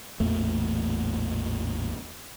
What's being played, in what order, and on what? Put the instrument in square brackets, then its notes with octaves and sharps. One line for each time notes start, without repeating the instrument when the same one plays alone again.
[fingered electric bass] A1 E2 A#2 A3